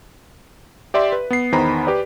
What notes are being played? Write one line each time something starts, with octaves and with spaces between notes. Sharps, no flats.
G4 D5 E5 C6
B4
B3 C7
E2 D#3 B3 C5 A#5 B5
G4 B4 D5